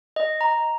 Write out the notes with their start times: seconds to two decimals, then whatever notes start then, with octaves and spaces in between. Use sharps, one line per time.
0.16 D#5
0.41 A#5